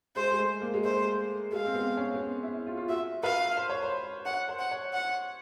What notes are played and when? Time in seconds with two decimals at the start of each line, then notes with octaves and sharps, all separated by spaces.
0.16 G#3 C5
0.31 G#3
0.39 A3
0.61 A#3
0.74 G#3
0.84 A3 C5
1.52 G#3 F5
1.66 C4
1.75 B3
1.97 C#4
2.14 B3
2.21 C4
2.43 E4
2.66 F4
2.77 F4
2.89 F#4 E5
3.23 B4 F5
3.57 C5
3.69 C#5
3.82 C5
4.26 C#5 F#5
4.49 C5
4.59 F#5
4.71 C#5
4.93 F#5